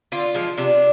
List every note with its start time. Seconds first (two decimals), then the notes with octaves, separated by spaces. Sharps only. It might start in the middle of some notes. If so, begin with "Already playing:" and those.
0.12 D3 F4
0.35 F3 G#3
0.58 C3 D4